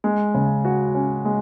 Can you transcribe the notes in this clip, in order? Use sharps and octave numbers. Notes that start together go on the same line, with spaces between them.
G#3
C#3
F#4
C#4
G#3